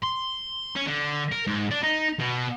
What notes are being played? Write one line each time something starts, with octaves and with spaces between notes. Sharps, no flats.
C6
C#4
D3
A#4
G#2
D4
D#4
B2